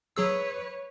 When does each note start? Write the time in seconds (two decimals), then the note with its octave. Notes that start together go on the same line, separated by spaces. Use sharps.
0.17 F#3 G#4 B4 C#5 E6